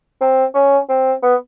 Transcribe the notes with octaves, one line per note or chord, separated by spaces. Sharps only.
C4
C#4
C4
B3